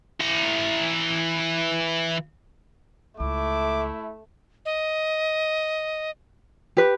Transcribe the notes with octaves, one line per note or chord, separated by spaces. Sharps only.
E3 A#5
C#2 A3 E4 D6
D#5
G4 B4